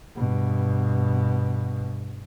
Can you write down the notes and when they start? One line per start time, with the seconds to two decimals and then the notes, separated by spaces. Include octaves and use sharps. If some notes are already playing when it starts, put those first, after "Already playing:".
0.17 G2 B2